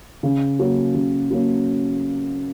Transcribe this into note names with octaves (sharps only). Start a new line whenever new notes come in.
C#3
F#3 A#3 C#4
C#3
F#3 A#3 C#4